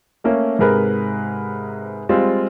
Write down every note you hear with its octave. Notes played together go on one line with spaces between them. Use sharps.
A3 A#3 C#4
G#2 C3 G#4 A#4 B4
G3 G#3 C4 F4